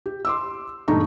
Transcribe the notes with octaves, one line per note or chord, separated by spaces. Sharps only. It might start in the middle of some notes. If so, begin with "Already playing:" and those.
G4
C6 D6 E6
E1 G2 A3 D#4 A#5 C#6